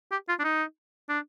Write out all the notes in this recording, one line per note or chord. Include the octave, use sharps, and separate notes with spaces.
G4
F4
D4
D#4
D4